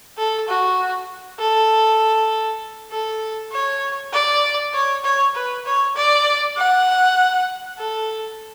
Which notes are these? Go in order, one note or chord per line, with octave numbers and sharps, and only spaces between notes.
A4
F#4
A4
A4
C#5
D5
C#5
C#5
B4
C#5
D5
F#5
A4